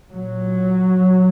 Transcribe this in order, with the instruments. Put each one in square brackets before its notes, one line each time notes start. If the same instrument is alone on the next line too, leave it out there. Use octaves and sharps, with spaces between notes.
[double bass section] A#2 F#3